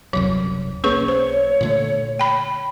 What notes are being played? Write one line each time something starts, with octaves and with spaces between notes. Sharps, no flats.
D#1 C2 F#2 F#3
B1 A#3 C#4 G#4 B4 C#5 C#6
C5
A#2 D3 A3
G5 B5